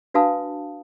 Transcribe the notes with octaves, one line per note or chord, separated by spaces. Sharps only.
D4 F#4 B4 F5 A5 D#6